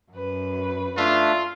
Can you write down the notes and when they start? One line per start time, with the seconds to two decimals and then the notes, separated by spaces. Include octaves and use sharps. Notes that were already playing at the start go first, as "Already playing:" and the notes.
0.11 F#2 B4
0.97 A3 D4 F4 E5